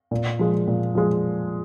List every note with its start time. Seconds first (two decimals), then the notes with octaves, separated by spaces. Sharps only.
0.11 A#2
0.39 F3 G#3
0.67 A#2
0.95 F3 G#3